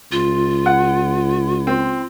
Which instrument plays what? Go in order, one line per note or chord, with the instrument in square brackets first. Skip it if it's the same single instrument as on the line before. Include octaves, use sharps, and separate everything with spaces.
[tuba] C#2 [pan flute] F4
[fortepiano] F#5
C4